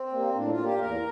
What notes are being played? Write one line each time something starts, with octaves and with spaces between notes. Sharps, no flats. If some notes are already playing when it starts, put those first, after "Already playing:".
Already playing: C4
G3 A#3
A2 D4
F4
G3 A#3
G4
E2 A#4